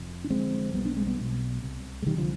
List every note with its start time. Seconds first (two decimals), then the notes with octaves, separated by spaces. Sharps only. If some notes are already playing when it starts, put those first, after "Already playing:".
Already playing: F1 F2
0.24 D4
0.30 F1 F2 D3 G#3 C4
0.74 B1 B2 G3 B3
0.85 B3 D4
0.97 G#3 C4
1.07 G3 B3
1.18 B1 B2
1.62 C2 C3
2.02 G#3
2.06 C2 C3 D#3 G3
2.18 D3 F3